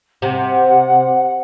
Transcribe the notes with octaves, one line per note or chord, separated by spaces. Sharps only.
C3 F#5